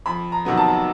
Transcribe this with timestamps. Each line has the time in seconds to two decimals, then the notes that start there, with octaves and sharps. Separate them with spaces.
0.06 F2 B5
0.32 A#5
0.45 C3 D#3 F#3 B3
0.57 A5